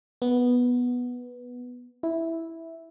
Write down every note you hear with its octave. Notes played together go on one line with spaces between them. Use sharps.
B3
E4